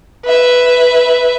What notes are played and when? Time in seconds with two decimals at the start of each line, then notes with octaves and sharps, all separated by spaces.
0.25 B4 E5